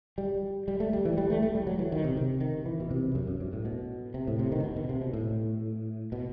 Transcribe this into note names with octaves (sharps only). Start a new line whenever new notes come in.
G3
G3
A3
G3
E3
G3
A3
A3
G3
F#3
E3
D#3
C3
C3
D#3
E3
B2
C3
F#2
F#2
G2
A2
B2
C3
A2
C3
D#3
B2
B2
C3
B2
A2
B2